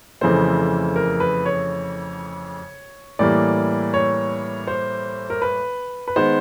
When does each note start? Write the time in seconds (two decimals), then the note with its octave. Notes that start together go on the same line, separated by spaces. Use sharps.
0.21 F2 C#3 E3 A3 C5
0.96 A#4
1.20 B4
1.45 C#5
3.19 A2 E3 G3 A#3 D5
3.94 C#5
4.67 C5
5.30 A#4
5.42 B4
6.08 B4
6.16 D#3 G#3 B3 C5